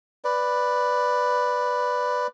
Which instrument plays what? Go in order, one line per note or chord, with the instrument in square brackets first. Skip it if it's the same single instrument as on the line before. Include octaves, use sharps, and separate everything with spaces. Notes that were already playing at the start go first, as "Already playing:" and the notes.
[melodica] B4 D5